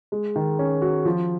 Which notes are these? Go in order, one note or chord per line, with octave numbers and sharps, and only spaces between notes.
G#3
D#3
C#4
F#4
F3